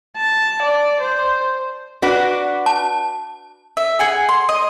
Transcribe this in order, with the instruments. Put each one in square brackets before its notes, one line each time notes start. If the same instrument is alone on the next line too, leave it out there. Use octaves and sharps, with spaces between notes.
[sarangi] A5
D5
C5
[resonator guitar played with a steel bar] D4 F#4 B4
[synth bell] A5
[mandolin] E5
G#4 F#5 G#5
C6
D#5